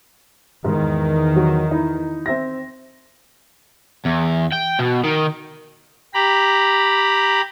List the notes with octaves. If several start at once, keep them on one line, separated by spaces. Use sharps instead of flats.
E2 G#2 D#3
F#3 F#4
D#4 E4
C4 E5 A#6
E2
G5
B2
D#3
G4 A#5 B5